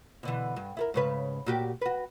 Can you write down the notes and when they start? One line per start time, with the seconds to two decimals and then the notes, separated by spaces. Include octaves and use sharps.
0.23 B2 D3 E3
0.56 G2
0.77 E4 A4 A#4
0.94 G#2 C#3 B4
1.46 A#2 F#4 G4
1.81 F#4 B4